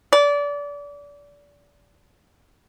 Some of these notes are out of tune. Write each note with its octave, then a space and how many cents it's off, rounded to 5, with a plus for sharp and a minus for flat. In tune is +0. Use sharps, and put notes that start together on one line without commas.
D5 -30